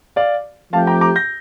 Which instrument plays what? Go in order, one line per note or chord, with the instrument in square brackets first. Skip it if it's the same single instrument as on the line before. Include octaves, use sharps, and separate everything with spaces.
[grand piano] D5 F5
[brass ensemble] F3 A3 C4 G4 [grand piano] F5 A5
[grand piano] G5 A#5
A#5 D6
G6 A#6